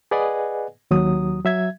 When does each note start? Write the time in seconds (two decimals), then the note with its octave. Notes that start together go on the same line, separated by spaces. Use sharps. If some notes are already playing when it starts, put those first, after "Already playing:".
0.11 G#4 B4 D5 D#5 F#5 G#5
0.91 D#2 F#3 D#6
1.44 F#3 E5 G#6